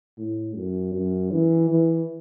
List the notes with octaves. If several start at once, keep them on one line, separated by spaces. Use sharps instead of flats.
A2
F#2
F#2
E3
E3